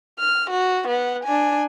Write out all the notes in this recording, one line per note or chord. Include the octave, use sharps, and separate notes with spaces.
F6
F#4
B3 F#5
D4 G#5